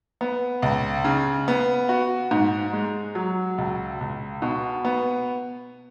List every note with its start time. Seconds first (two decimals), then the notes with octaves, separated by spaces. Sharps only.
0.21 B3
0.62 C#2
1.04 C#3
1.48 B3
1.89 F#4
2.31 G#2
2.73 G#3
3.15 F#3
3.58 C#2
4.01 C#2
4.42 B2
4.85 B3